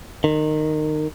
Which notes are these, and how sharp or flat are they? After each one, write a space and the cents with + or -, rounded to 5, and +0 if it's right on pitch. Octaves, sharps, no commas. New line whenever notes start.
D#3 -20